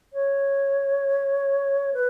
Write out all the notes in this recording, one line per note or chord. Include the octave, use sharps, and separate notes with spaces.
C#5
B4